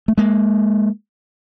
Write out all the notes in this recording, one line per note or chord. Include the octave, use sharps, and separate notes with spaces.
A3
G#3 A#3